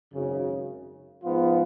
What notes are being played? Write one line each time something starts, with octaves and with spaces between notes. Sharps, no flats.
G#1 F#2 C#3
G#2 F3 B3 F4